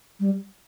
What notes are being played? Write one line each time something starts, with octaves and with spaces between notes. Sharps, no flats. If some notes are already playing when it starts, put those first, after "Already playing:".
G3